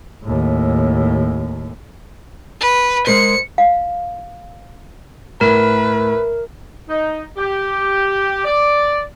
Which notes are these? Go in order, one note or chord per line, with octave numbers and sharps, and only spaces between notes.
D#2 A2
B4
G#3 A#4 C5 C#7
F5
A2 A#4 B4
D#4
G4
D5